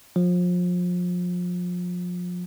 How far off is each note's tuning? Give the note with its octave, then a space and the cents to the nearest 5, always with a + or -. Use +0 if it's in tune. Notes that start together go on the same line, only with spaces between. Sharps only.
F3 +30